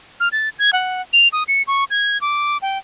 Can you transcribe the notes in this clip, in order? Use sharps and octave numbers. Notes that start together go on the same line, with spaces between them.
F6
A6
G#6
F#5
F7
D#6
C#7
C#6
G#6
D6
G5